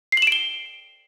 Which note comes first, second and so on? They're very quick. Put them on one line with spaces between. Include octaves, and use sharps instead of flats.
C7 F#7 E7 D7 G7